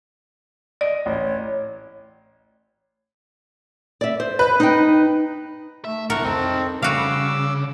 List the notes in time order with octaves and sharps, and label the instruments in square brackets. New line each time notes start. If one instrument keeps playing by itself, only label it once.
[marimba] D5 [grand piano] D#5
[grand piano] A1 [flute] C#5
[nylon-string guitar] D5 E5
C5
[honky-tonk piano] B4
[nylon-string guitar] D#4 G5
[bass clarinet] A3 [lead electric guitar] E5
[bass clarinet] C2 [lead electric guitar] A2 C3 [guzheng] A#4 [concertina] F#5 C#6
[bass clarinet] F2 [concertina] C4 [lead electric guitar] D#4 A5
[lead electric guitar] C#3 [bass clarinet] G3 [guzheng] F#4 F5 [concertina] D6 E6